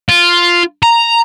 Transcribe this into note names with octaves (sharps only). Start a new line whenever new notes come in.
F4
A#5